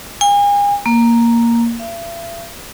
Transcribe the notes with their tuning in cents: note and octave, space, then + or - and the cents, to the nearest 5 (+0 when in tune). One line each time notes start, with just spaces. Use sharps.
G#5 -40
A#3 +0
E5 +45